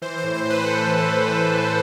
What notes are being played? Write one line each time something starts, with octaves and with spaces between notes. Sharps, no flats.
E3 C5
C5
A2
C5
E3
B4
A2 A4
E3
E3
E3
E3